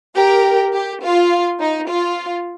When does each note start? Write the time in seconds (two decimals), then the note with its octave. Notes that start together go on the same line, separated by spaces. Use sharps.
0.17 G4 A#4
0.74 G4
1.03 F4
1.60 D#4
1.88 F4